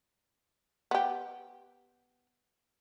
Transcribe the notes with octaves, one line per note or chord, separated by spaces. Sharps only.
B3 G4